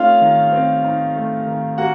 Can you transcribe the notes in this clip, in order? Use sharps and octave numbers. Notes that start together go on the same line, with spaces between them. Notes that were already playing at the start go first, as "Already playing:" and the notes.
Already playing: A3 C4 C#4 D#4 F4 F5
D#3
C4
D#4
A3
D#3
A#3 F#4 F#5